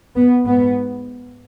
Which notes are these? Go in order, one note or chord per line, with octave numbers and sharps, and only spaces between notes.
B3
G#2 B3